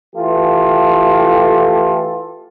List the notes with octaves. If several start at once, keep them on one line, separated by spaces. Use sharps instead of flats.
E3 A3 F4 G4 A4